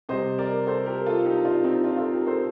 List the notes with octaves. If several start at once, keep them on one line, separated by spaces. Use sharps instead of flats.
C3 G3 C5 D#5
A#4 D5
A4 C5
G4 A#4
F4 A4
D#4 G4
D4 F4
C4 D#4
D4 F4
F4 A4
G4 A#4
A4 C5